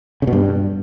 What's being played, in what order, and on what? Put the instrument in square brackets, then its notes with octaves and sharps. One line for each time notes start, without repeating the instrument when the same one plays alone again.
[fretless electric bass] C#3
B2
G2